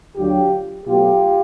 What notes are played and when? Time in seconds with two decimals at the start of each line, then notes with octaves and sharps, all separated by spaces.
0.16 D2 D3 F#3 F4 G4
0.86 B2 F#3 A3 F4 G4